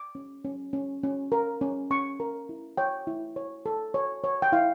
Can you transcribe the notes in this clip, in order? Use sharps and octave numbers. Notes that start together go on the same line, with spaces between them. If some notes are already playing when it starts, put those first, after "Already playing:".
Already playing: D6
C#4
C#4
C#4
C#4
A#4
C#4
C#4 C#6
A#4
E4
C#5 G5
E4
C#5
A4
C#5
C#5
G5
E4 F5